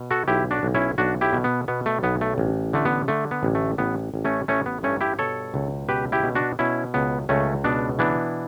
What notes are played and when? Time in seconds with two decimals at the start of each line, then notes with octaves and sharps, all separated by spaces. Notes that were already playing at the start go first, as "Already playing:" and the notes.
Already playing: B2
0.11 F#4 A4
0.28 B1 E4 G4
0.51 D4 F#4
0.63 B1
0.75 C#4 E4
0.98 B1 D4 F#4
1.21 E4 G4
1.33 B2
1.44 B3
1.68 B2 B3
1.86 A3
2.03 B1 B3
2.21 A3
2.38 A1
2.73 D3 A3
2.85 B3
3.08 D3 A3
3.31 B3
3.43 A1
3.55 A3
3.78 A1 B3
4.14 A1
4.25 A3 C#4
4.48 A1 A3 C#4
4.66 B3
4.83 G2 A3 C#4
5.01 E4 G4
5.19 B2 A4 C#5
5.54 C#2
5.89 B2 G4 B4
6.12 E4 G4
6.23 B2
6.35 D4 F#4
6.59 B2 C#4 E4
6.94 C#2 B3
7.29 C#2 A3 C#4
7.64 B2 B3 D4
7.99 E3 B3 D4